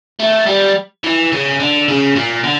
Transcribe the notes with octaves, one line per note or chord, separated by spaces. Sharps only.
A3
G3
E3
C#3
D3
C#3
A#2
D3